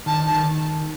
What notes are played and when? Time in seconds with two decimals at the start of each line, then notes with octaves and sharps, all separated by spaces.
0.06 D#3 A5
0.26 A5
0.32 D#3